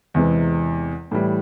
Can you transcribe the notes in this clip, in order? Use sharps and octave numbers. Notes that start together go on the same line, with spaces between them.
E2 C3 E3 G#3 C4
A2 E3 G3